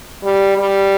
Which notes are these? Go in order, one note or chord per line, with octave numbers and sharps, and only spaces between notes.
G3
G3